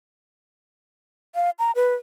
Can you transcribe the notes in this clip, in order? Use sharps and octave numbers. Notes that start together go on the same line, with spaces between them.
F5
A#5
B4